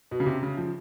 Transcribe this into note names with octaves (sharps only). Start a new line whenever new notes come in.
B2
C#3
C3
C#3
F3